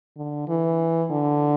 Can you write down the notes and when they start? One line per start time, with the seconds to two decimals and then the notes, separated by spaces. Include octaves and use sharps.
0.17 D3
0.48 E3
1.11 D3